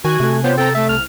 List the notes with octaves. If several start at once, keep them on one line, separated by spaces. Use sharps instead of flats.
D#3 F#4 G#5 F#6 G#6
C3 A3
B3 F4 G4 C5 C#5
C4 A4 G5 A#5
A3 E5 A5 A6
C2 F6